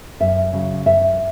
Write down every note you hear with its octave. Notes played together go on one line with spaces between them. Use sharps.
F#2 E5
C#3 F#3
F#2 E5